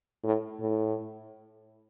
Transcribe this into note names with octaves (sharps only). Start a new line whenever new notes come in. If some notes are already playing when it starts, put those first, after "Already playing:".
A2
A2